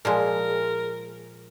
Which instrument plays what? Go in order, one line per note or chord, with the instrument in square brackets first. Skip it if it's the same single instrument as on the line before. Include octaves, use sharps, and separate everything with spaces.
[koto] A#2 F3 G#3 [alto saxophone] A#4